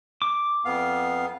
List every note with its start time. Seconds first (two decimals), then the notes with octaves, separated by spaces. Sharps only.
0.22 D6
0.65 F2 B3 F5